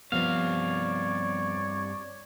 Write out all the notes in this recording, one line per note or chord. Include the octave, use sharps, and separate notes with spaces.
G2 F3 G3 B3 C4 C#5 D5 F5